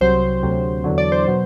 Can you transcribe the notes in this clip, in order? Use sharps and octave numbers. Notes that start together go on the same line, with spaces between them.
C2 C3 F#3 C5
D2 C3 F#3
E2 D3 F#3
D5
C5
B2 F#3